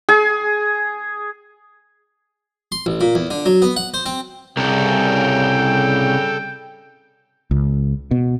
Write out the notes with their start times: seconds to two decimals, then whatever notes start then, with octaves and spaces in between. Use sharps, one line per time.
0.09 G#4
2.72 C6
2.86 A1
3.01 A#2
3.15 E2
3.31 D3
3.46 F#3
3.62 B3
3.76 F#5
3.94 C5
4.06 C4
4.57 C2 C#3 G3 A4 A#4 G5
7.51 C#2
8.11 B2